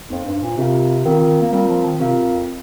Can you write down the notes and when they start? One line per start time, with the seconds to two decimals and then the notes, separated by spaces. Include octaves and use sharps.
0.09 F2 A#3 D#4 C5 F5
0.25 G2
0.42 A#2
0.57 C3 C4 F4 A#4 F5
1.05 D#3 C4 F4 A#4 F5
1.20 D#3
1.41 A#3
1.53 G3 C4 F4 A#4 F5
1.69 F3
1.85 D#3
2.00 C3 C4 F4 A#4 F5
2.16 A#2
2.32 F2